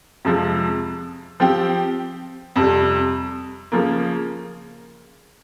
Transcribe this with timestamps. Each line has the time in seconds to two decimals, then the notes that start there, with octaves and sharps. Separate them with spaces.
0.25 F2 C3 F3 G#3
1.40 F3 C4 G4
2.56 F2 C3 G3
3.72 C#3 F3 A#3